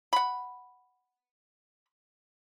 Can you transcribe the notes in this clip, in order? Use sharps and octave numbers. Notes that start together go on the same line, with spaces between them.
F#5 B5